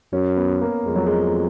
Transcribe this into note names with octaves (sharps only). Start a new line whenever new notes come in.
F#2 C#4
B3
A#3
F2 G#3
F#3
G#3